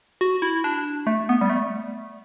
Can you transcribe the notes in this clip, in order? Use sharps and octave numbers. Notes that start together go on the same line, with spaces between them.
F#4
E4
D4
A3
B3
G3
A3